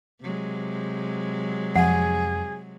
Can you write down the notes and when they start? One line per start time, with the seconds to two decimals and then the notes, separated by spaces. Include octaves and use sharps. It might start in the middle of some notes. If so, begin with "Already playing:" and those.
0.21 C3 F#3 G#3
1.76 F2 G#4 F#5